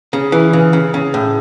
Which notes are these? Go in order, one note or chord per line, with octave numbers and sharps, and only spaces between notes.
C#3
E3
C#3
C#3
C#3
A2